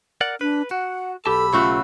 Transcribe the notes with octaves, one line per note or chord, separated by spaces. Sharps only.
A#4 D5 F#5
D4 B4
F#4 F#5
B1 G4 A4 A5 B5 E6
C#3 A3 F4 F#4